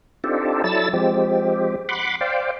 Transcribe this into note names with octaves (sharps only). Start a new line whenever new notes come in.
C4 D4 D#4 F4 G4 A4
F#3 E4 A4 D5 E6 A6
F3 G#3 C4 G4
F#5 B5 C6 D6
C5 D5 F5 G5